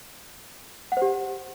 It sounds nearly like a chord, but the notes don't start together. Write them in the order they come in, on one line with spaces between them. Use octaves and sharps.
F#5 C5 G4